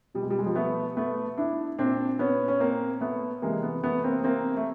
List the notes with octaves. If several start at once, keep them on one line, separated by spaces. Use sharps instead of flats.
B2 G3
G#3
G3
G#3
F3 G3
A3 B3
A3 B3
D4 E4
A#2 C4 D4
B3 C#4
C#4
A#3 C4
A3 B3
C3 E3 G#3 A#3
A3 B3
A3 B3
A#3 C4
A#3 C4
A3